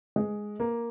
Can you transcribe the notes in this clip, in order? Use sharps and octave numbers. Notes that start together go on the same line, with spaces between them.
G#3
A#3